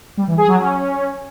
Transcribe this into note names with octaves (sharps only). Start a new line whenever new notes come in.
G3
E3
G#4
F#3
C#4